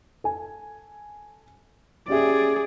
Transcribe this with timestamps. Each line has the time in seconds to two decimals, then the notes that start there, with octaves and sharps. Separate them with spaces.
0.24 A4 G#5
2.08 C#4 G4 G#4 D5 E5